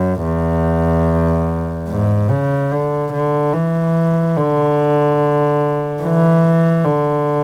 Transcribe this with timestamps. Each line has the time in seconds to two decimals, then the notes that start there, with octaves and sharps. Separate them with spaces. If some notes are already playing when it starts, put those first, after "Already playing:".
Already playing: F#2
0.23 E2
1.89 G#2
2.30 C#3
2.72 D3
3.13 D3
3.54 E3
4.36 D3
6.03 E3
6.85 D3